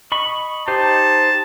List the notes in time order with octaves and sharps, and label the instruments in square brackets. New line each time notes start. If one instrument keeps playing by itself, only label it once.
[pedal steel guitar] D#5 B5 C#6
[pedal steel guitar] D#4 G4 C5 [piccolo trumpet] A5